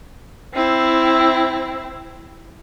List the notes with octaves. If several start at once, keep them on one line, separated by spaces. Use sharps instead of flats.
C4 E4